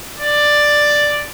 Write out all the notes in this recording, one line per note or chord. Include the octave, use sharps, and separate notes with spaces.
D5